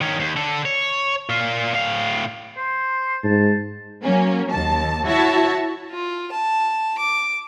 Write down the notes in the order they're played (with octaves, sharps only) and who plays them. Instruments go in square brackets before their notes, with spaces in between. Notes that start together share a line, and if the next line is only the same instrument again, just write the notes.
[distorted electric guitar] D#3 C#4
D#2
D3 A4
C#5
A#2 F4
A2 F5
[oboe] C5
[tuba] G#2 [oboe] A5
[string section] F#3 A#3 C#4
D#2 A5
E4 F#4 C#5 E5 A5
[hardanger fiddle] F4
A5
D6